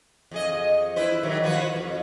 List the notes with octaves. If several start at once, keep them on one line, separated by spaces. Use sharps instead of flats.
F2 G#4 D#5
E4 B4 C5
D#3 F#3 G3
F3 F#4 B4
F2